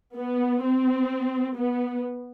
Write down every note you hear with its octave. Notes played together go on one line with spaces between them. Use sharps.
B3
C4
B3